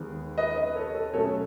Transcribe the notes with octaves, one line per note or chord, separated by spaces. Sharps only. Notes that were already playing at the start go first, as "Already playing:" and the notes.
Already playing: D#2 D#3 G#3 B3 D#4
B4 D#5
B4 D#5
A4 C#5
A4
B2 F#3 A3 C#4 A4 C#5